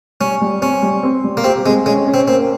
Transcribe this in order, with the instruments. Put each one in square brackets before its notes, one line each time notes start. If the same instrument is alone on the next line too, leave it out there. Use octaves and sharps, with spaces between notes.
[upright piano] G3 [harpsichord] C#4
[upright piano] G3
[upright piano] C4 [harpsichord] C#4
[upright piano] G3
C4
G3
[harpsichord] A#3
[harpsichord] C4 [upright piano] G4
[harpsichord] G#3 [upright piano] C4
[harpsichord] G#3 [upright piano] C#4
[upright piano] C#4
[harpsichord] C4
[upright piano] A#3 [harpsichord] C4